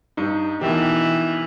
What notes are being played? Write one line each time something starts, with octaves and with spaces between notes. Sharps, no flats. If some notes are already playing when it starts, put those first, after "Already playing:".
G2 D#4
B2 D#3 E3 G4